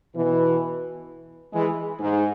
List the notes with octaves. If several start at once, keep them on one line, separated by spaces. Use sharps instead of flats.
B2 E3
E3 G#3
G#2